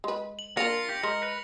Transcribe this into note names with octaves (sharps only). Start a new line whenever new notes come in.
G#3 B4
F#7
A#3 D4 F4 A#4 A#6 C#7 F7
G4
G#3 A#4
B4